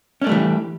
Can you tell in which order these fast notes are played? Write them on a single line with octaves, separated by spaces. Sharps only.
C#4 D4 A3 G3 E3